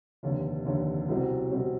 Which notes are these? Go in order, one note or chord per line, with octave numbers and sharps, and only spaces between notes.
F1 D#2 D3
F1 D#2 D3
C2 B2 G3 C4
C2 B2 G3 C4